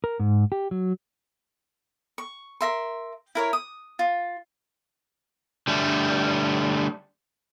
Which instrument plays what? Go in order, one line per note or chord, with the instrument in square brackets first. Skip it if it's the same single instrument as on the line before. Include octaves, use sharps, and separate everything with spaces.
[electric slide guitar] A#4
G#2
G4
F#3
[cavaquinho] C#6
A#4 E5 C6
E4 A#4 C#5
D#6
F4
[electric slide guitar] D3 G3 A3